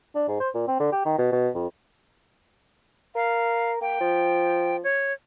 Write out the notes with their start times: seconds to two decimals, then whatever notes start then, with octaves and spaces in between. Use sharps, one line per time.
0.15 D4
0.28 G#2
0.40 C5
0.54 A#2
0.68 C4
0.80 D3
0.92 G4
1.05 D#3
1.19 B2
1.32 B2
1.55 F2
3.15 A#4 F5
3.81 A#3 G5
4.00 F3
4.84 C#5